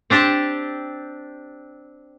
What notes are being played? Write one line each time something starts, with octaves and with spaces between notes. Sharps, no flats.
C4 D4 G4 A5